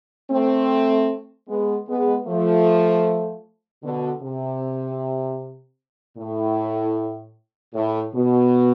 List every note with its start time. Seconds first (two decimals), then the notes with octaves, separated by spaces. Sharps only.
0.31 A3 C4
1.49 G#3 B3
1.88 G#3 B3
2.27 F3 A3
3.84 B2 D3
4.23 C3
6.18 A2
7.74 A2
8.15 B2